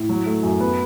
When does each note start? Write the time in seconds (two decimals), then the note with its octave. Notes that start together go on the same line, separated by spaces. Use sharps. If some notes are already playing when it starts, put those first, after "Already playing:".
Already playing: A2
0.09 F#3
0.26 A3
0.43 F#2
0.60 B3